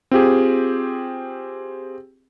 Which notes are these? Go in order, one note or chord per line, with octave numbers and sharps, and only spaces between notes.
C4 F4 G4 G#4